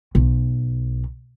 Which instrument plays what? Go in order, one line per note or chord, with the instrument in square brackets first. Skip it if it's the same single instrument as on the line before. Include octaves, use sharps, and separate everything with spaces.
[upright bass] B1